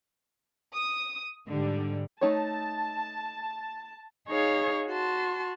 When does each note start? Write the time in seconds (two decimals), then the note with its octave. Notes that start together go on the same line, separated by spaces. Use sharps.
0.73 D#6
1.48 G#2 D3 G3
2.21 A3 D#4 C#5 A5
4.28 D#4 G#4 C#5 F5 C#6
4.88 F#4 A5 C6